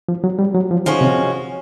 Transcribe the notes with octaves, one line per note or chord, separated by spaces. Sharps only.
F3
F#3
G3
F#3
F3
D#3 F3 G#3 C#4 F#4
C3